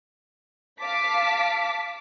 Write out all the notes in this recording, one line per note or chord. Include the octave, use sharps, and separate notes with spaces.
F5 A5 D6 B6